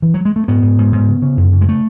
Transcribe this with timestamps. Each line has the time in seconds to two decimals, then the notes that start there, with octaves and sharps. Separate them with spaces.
0.02 E3
0.14 F#3
0.25 G#3
0.36 A3
0.48 G#2 B3
0.62 G#2
0.78 G#2
0.92 G#2
1.08 C#3
1.22 C#3
1.37 F#2
1.52 C#3
1.61 G#3
1.69 A3